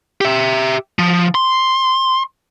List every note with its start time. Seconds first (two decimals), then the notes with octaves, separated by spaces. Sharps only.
0.21 G4 E5
0.99 F3
1.35 C6